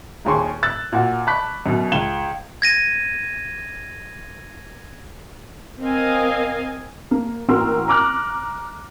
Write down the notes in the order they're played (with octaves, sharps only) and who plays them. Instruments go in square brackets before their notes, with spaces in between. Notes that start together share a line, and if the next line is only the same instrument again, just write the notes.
[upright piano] D#1 D#2 G#4 C6 C#6
E6 F#6 A6
A#2 F#4
A5 B5 C#6 D6 F#6 B6
F#2 B2
C#2 E7 G7
[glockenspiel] G#6 A#6 D#7
[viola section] C4 A#4 D#5 F5 G#5
[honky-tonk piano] A#3
A1 A#3 F#4 A#4 C6 E6
A#5 D6 F6 F#6